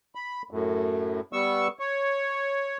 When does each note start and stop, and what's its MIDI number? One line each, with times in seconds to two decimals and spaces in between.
0.15 0.42 83
0.51 1.20 42
0.51 1.20 45
1.33 1.68 55
1.33 1.68 59
1.33 1.68 85
1.33 1.68 88
1.79 2.78 73